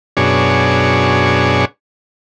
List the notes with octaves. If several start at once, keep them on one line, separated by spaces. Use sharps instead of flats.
F#2 B2 D4 G#4 C#5